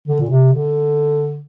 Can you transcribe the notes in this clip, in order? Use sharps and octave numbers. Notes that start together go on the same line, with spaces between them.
D3
A#2
C3
D3